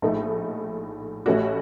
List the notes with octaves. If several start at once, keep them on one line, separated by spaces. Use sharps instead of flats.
A#1 A2 A3 D#4 A4
A1 A2 A3 C#4 F#4